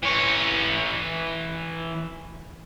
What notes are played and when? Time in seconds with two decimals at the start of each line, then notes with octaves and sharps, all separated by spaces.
0.03 E3 C#5